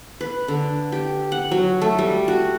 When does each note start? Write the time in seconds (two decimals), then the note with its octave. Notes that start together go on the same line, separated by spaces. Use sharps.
0.21 B4
0.48 D3
0.92 G4
1.32 F#5
1.51 F#3
1.82 A3
1.98 G3
2.28 F#4